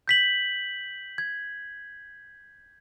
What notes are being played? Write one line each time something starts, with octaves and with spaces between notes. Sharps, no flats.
G6 B6 F#7
G#6